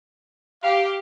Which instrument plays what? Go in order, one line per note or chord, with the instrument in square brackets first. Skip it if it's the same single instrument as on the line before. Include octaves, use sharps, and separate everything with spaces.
[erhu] G4 [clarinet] F5